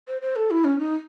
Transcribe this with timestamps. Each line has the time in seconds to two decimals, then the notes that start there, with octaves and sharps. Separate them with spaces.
0.08 C5
0.22 C5
0.36 A4
0.51 E4
0.65 C#4
0.79 D#4